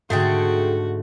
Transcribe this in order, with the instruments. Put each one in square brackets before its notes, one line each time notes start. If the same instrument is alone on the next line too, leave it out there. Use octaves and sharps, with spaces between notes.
[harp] G#2 D3 [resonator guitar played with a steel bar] A3 [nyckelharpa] F#4 [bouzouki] G#4 A4 G5